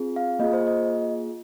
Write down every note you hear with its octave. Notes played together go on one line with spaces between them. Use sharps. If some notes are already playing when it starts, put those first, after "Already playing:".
Already playing: C4 F4 G#4
F5
A#3 F4 G#4 D#5
C5
D#5